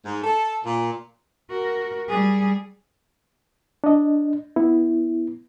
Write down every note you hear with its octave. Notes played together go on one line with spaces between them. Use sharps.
G#2
A4
A#2
F#4 A#4
G3 G#4
D4 D#5
B3 E4